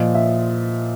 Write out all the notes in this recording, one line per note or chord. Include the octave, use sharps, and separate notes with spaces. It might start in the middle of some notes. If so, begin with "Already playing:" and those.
Already playing: A#2 F3 D#5
E5